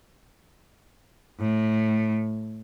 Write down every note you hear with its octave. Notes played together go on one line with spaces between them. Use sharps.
A2